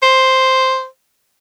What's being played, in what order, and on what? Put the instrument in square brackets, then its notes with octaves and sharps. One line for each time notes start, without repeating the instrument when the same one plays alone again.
[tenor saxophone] C5